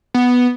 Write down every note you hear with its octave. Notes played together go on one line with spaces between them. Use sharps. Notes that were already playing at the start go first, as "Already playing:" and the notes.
B3